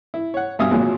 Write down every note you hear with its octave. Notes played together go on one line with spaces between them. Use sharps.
E4
C#5 F#5
G2 B2 E5 F5 G#5 D#6
G#1 D#2 A#2 F#3 G#3